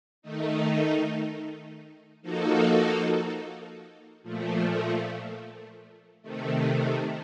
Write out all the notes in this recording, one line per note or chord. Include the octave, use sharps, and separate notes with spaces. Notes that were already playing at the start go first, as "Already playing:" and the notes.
D#3 A3 D#4
F3 A#3 D#4 F#4 A4
A#2 F3 A3
C3 D#3 A3